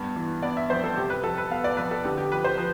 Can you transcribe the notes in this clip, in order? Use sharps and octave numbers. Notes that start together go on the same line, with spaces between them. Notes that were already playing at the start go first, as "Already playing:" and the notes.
Already playing: G2 B3
E3
B3 D5
E5
F2 C5
A4
C3 G4
B4
F2 A4
B4
B3 F5
D5
F2 B4
A4
D3 G4
G4
F3 B4
C5
F3